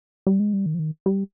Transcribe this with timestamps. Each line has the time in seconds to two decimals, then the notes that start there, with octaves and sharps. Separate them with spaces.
0.27 G3
0.40 G#3
0.53 G3
0.66 D#3
0.74 F3
0.79 D#3
1.06 G3